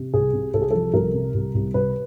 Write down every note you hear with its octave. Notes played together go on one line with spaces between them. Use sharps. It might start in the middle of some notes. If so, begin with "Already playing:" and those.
Already playing: C3
C2 G#4
C3
C2 A4
G#4
F3 A4
C2 A#4
C3
C2
C2
C2 B4